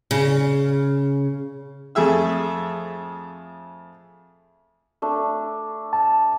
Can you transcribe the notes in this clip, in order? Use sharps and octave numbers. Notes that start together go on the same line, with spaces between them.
C#3
F2 A3 G#4 E5 E6
A3 D4
A5